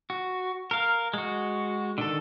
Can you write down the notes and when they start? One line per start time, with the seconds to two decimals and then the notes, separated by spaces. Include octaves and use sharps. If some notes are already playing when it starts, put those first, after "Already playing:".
0.10 F#4
0.71 A#4 F5
1.14 G#3 F#4
1.98 D3 D#3 A4